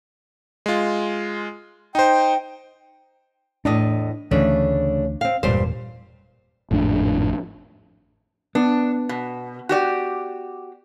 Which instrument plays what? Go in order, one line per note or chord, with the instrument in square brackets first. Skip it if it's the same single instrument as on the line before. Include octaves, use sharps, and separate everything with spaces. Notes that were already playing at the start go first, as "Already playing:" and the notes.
[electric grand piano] G#3 F4
[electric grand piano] D#4 C5 [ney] G5
[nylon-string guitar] E2 A2 D#5 [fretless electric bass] D4
[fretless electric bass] D2 E3 [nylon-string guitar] C#3 A3 D4
[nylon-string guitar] C4 F5
[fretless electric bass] E1 A#2 [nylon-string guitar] G2 G3 C5
[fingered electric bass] G#1 F2 A2 D4
[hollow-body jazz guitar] B3 [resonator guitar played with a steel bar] D4
[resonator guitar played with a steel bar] B2
F#4 G4 D5